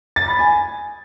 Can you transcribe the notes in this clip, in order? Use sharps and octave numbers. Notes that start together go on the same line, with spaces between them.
A6
B5
G#5